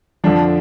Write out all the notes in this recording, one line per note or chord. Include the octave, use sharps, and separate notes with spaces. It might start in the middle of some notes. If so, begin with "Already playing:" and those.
F2 D3 F3 D4